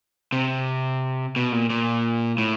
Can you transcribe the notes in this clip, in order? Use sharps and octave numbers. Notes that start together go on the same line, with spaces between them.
C3
B2
A#2
A#2
A2